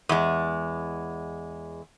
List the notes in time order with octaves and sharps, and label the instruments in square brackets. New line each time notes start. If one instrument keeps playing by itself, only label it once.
[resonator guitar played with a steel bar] E2 G#3